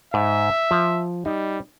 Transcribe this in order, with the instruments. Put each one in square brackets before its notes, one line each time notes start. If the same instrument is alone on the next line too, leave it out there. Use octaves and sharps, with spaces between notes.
[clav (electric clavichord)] G#2 [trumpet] E5
[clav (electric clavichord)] F3
[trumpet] G3 [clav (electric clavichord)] D#4